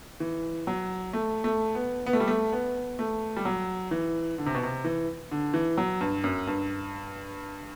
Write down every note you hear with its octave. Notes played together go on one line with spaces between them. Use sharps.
E3
F#3
A3
A3
B3
B3
A3
G3
A3
B3
A3
G3
F#3
E3
D3
C3
B2
C3
E3
D3
E3
F#3
G2
F#2
G2